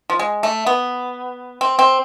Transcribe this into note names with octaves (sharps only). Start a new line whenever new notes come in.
F3
G#3
A3
B3
C4
C4